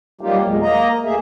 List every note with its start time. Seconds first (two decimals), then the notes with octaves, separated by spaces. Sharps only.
0.21 F#3 G3 A#3 D#4 F4 G4
0.44 E2 A#2 F#3 G#3
0.62 A#3 D#5 A#5
1.05 D#2 A3 A#3 G#4 E5